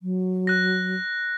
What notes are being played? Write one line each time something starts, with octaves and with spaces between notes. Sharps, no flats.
F#3
F#6 A#6